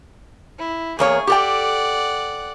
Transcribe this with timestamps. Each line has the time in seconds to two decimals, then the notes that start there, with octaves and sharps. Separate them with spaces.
0.59 E4
0.99 E2 A#3 G#4 C#5
1.27 G4 A4 D5 F#5 G5